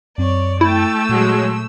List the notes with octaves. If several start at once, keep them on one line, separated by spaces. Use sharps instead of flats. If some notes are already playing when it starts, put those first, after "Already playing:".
F#2 C4 C#5 D5
A3 E4 G5 E6 A6
A#2 F#3 G#3